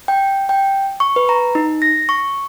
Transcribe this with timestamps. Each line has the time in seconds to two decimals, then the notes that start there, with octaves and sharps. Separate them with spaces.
0.08 G5
0.49 G5
1.00 C#6
1.16 B4
1.29 A#5
1.55 D#4
1.82 A#6
2.09 C#6